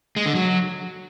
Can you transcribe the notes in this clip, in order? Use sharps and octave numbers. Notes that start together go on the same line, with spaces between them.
G#3
D3
F#3